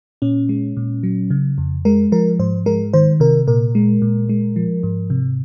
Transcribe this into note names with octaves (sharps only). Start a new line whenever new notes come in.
A#2 C#4
G#3
A#2
F#3
C#3
F2
G#3 A#4
F3 A#4
G#2 C5
G#3 A#4
D#3 C5
C3 A#4
A#2 A#4
G#3
A#2
G#3
F3
G#2
C3